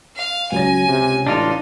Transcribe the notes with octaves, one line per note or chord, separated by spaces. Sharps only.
F5
C#2 F#3 C#4 G#5 A#6
C3
A1 D4 D#4 F4